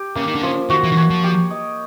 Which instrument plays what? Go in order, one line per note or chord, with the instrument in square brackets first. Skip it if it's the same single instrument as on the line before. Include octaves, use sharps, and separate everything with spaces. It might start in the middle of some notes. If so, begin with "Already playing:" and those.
Already playing: [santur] G4
[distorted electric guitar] C#3 [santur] A#3
[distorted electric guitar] D#3
D3
[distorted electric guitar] C#3 [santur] F3
[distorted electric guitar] D#3 [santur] F#4
[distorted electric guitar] E3
D#3
[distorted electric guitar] E3 [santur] C#5
[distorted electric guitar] F3
[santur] G4
D#5